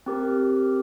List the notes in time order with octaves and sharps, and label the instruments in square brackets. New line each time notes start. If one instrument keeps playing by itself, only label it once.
[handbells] C4 G4 A#4